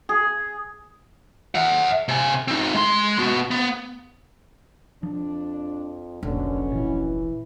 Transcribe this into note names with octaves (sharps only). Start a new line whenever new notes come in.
G#4
E5 F#5
C3 G#5
C4 D#4
G#3 C6
B3 F#4
B3
F2 F3 D4
F1 A#1 B2 D3 F#3 C#4
A#2 E3 F3